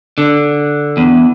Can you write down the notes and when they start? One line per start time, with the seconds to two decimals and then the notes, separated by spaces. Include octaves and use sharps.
0.18 D3
0.97 E2